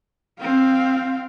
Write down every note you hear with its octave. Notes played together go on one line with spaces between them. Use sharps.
C4 F5